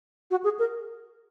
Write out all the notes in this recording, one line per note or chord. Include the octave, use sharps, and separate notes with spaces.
F#4
G#4
A#4